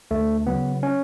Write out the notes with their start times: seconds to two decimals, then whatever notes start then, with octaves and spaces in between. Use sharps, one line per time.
0.11 D2 A3
0.47 C#3 F#3 B3
0.83 C#4